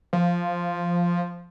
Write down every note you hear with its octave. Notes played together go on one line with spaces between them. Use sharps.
F3